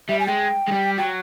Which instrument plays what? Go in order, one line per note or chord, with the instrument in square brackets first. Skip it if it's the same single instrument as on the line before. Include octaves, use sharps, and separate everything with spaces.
[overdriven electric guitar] G3 [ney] E5
[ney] G#5
[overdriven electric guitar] G#3 [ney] G5
[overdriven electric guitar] G#3
G3
[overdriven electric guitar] F#3 [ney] G5